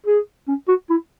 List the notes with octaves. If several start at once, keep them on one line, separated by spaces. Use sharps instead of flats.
G#4
C#4
F#4
E4